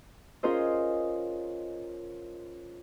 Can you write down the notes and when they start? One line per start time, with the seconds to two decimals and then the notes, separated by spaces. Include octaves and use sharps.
0.43 C#4 F4 G#4 A#4 C5 D#5